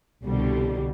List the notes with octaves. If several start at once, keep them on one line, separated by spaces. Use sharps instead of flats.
C2 B2 D3 G3